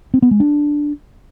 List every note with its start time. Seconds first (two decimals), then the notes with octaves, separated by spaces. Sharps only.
0.14 C4
0.22 B3
0.31 G#3
0.40 D4